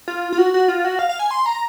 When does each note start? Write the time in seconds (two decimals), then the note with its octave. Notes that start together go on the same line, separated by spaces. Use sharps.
0.08 F4
0.32 F4
0.38 F#4
0.54 F#4
0.68 F4
0.85 F#4
0.99 F5
1.09 F5
1.19 G#5
1.31 C6
1.46 A#5